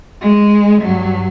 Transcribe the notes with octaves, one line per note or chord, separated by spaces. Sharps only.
G#3
G2 F#3